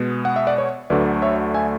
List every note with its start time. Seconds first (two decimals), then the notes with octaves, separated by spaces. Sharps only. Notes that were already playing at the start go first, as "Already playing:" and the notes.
Already playing: B2 G#3 B3
0.25 F#5
0.36 E5
0.47 D5 F#5
0.58 C#5
0.90 D2 D3 F#3 A3 D4 B4 D5
1.22 C#5 E5
1.54 E5 G#5